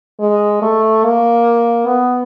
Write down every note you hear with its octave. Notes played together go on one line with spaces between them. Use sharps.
G#3
A3
A#3
B3